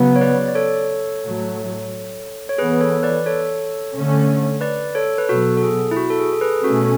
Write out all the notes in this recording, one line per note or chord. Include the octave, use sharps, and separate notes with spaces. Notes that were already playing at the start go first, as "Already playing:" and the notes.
Already playing: C#3 F#3 B3
C#5
B4 D5
D5
A4 C#5
A2 F#3 A3
C#5
E3 B3 G#4 B4
A4 C#5
B4 D5
A4 C#5
D3 A3 C#4
B4 D5
A4 C#5
B4
B2 F#3 B3 F#4 A4
A4
G#4
E4
F#4
A4
G#4
A4
G#4 B4
B2 A3 C#4 F#4 A4